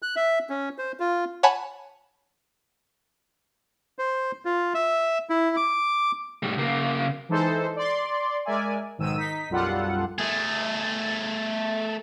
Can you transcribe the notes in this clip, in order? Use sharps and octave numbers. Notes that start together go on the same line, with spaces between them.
F#6
E5
C#4
C5
F4
C#5 F#5 G#5 A5 B5
C5
F4
E5
E4
D6
A2 G3
C#3 A#3
E3 G#3 D#4 A4 C5
D5 C6
G#3 A#4 D5 E5 G#5
B1 G#2 D#3 E6 D#7
D#4 B6
B1 F#2 G3 F4 A4 F#5
A3 G#4